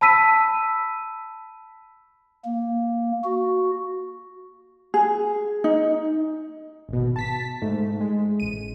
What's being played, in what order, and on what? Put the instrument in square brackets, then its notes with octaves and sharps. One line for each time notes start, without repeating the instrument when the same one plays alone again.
[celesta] A5 B5 E6 B6 D#7
[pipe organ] A#3
F#4
[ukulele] G#4
D#4
[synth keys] G#1 B2
A5 B6
G#2 A3
G#3
A1 D#7